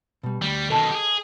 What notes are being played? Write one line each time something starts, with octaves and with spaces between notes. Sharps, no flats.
B2 G3
D2 G3
B2 D#3 A4 D#5 A5
G4 G#4